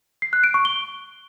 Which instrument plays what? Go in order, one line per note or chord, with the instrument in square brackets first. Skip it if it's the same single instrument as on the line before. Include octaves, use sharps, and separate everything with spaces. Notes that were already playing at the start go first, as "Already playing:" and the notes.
[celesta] C7
F#6
D7
C#6
G7